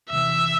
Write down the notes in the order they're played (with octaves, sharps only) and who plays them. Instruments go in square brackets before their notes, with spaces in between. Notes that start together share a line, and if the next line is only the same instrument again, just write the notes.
[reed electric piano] E2 C3 E3 [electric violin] E5